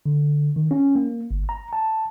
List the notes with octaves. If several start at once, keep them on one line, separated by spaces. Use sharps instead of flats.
D3
D#3
C#4
A#3
G1
A#5
A5